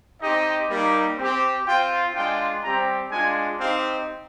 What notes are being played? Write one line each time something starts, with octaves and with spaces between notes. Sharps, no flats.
C4 D#4 G4 D#5
G3 A#3 D#4 G4
C4 G4
C4 F4 G5
G#3 D4 F4 G5
G3 C4 G4 A#5
G#3 D4 F4 G#5
C4 D#4 G4 F5